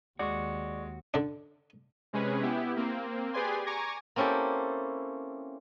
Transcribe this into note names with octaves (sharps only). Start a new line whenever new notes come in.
D#2 G#3 F#4 D5 C#6
D3 D4
C3 G#3 C#4 G#4 B4
B3 E4 G4
A#3 C4
G4 G#4 B4 D5 G#5 C6
G#5 A#5 C#6 D6 G#6 A#6
A#3 C4 C#4 E4 G4 A4